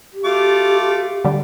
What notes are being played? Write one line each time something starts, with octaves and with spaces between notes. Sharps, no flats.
G4
A3 F4 F#4 D6
D3 G3